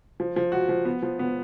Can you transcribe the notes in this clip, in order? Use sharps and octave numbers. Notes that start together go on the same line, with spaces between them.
F3
F3
F#4
F3
B3
F3
B3